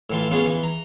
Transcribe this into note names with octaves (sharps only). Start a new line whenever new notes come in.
A2 E3 F4
B3 C#4 F4 G#4
E3
A#5